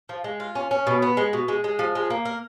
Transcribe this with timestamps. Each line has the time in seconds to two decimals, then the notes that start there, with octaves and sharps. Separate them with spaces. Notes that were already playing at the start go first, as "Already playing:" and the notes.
0.09 F3
0.24 G#3
0.40 F4
0.55 C#4
0.71 C#4
0.87 B2
1.02 B3
1.17 G#3
1.33 B2
1.48 G#3
1.64 G#3
1.79 F3
1.95 G#3
2.10 A#3
2.25 A#4